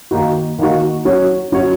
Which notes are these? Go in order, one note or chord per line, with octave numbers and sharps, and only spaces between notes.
D#3 A#3 D#4 F#4
D#3 A#3 D#4 F#4
F#3 C#4 F#4 C#5
F#3 C#4 F#4 C#5